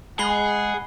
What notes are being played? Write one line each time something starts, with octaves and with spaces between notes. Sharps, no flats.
G#3 G#4 F#5 B5 C7 G7